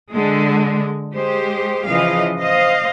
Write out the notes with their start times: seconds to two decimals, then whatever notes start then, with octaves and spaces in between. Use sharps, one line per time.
0.11 D3 G#3
1.14 G#3 G4 C5
1.88 C#3 E3 F3 D#5 F5
2.38 C5 D#5 F5